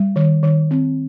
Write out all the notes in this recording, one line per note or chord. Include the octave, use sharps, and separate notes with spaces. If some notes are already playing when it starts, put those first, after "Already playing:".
Already playing: G3
D#3
D#3
C4